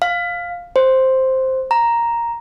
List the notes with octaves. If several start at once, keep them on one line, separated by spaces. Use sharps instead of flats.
F5
C5
A#5